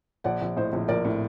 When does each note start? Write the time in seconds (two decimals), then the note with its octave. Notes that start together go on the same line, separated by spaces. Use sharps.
0.24 A#1 D5 F#5
0.41 A#1
0.56 A2 C5 D#5
0.73 A#1
0.88 A#1 A#4 D5
1.04 A2